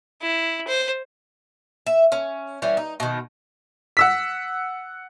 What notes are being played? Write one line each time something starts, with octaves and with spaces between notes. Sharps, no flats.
E4
C5
E5
C#4
E3 G3 C#4
D#4
B2 D#3
F#5 E6 B6